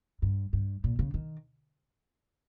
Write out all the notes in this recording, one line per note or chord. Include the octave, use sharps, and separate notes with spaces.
G2
G2
A#2
C#3
D#3